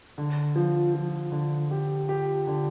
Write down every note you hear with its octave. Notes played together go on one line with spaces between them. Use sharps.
D3
F3
F3
D3
G4
G4
D3